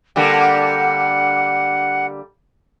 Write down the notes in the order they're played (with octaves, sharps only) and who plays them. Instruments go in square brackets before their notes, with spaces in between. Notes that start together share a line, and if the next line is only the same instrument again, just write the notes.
[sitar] D3 G3 A#3 [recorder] F#5